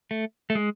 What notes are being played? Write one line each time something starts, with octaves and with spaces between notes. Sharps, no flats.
A3
A3
G#3